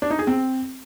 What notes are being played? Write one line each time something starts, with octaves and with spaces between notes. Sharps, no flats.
D4
D#4
G#4
C4